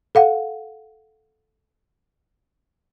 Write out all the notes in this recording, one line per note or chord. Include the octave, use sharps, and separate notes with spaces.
A4 F5 F#5